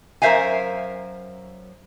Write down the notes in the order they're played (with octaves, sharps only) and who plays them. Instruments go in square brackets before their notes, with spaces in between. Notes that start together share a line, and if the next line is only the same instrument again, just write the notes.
[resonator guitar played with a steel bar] F#2 A#4 C5 E5 F5 G#5